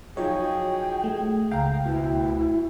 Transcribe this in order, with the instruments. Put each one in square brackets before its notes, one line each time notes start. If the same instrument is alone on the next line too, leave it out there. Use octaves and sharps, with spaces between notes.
[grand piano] F3 F#3 D#4 [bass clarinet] G#4 [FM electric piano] C#5 [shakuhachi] G5
[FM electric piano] A3
[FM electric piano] C#2 G5 [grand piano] F5 A#5
[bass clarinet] D2 [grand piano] B2 [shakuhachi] E4